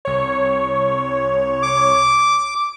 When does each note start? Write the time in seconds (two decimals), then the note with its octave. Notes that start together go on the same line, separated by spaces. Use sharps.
0.05 C2 C#5
1.63 D6